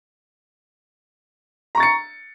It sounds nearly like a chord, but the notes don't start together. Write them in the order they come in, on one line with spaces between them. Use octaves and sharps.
A#5 C#6 A6 C#7